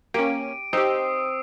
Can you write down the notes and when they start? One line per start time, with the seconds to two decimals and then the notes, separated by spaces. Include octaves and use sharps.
0.14 A#3 C#4 G4 D7 D#7
0.73 C4 D#4 G4 D#6 E6 C7